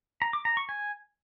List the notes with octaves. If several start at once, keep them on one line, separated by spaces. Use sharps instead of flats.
A#5
D6
A#5
C#6
G#5